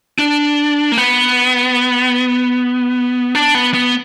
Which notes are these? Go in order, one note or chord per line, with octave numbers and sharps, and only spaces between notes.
D4
A#3
B3
D4
B3
B3